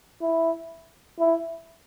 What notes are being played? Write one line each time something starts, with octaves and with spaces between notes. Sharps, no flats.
E4
E4